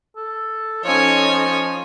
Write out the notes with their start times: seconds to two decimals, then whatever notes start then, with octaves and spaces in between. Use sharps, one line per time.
0.17 A4
0.84 F3 C#4 D#4 A4 C#5 G#5